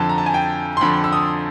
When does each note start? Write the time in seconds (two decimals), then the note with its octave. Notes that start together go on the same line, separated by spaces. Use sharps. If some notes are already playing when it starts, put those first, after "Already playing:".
Already playing: F2 D3 A5
0.09 A#5
0.18 A5
0.26 G#5
0.34 G5
0.77 C6
0.81 F2 D3 B5
1.04 E6
1.12 D#6